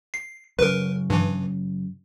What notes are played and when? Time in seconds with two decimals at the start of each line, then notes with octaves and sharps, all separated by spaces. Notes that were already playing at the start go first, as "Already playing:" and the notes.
0.14 C7
0.59 F#2 C#3 A#4 B4
1.10 G2 E3